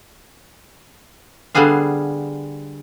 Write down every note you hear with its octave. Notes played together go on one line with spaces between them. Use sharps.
D3 G3 B3 G#4 F5